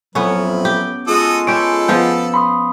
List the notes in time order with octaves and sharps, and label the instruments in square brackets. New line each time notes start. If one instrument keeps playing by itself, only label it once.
[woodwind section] F2 A2 F#3 [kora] B3 C#4 [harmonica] B4
[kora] G4
[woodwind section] G#3 F4 [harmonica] F#4 A4 D#6
[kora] C#4 G4 [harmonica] A4 B4 [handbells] D7
[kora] F3 B3 G5
[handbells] B5 C6 D#6